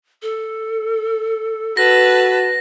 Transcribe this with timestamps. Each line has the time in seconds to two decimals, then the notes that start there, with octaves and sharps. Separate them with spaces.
0.22 A4
1.77 F#4 B4 A5 A#6